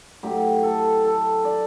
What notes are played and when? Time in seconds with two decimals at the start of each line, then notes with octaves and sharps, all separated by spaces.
0.23 A2 F#3 G4
0.63 A4
1.04 A4
1.45 D5